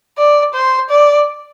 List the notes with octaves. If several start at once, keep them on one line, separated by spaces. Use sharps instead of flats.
D5
C5
D5